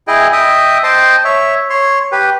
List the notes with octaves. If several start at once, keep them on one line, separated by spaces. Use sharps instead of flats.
E4 G#4 D#5 G5
D#5 E5 G5 D#6
C5 D#5 G5 A5 C6
C#5 E5
C#5 C6
G4 B4